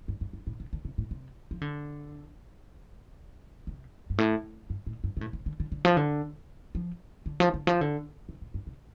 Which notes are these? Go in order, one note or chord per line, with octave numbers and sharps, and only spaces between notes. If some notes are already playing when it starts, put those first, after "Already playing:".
G2
G2
G2
A2
C3
D3
C3
A2
C3
F3
D3
C3
G2
A2
G2
A2
G2
C3
A2
C3
D3
D3
D3
F3
D3
F3
D3
F3
D3
F3
D3
C3
A2
G2
C3